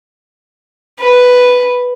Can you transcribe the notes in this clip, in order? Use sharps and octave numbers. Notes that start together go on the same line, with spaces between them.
B4